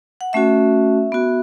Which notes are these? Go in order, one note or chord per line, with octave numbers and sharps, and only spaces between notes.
F#5
A3 C#4 F#4 E5
B3 F#4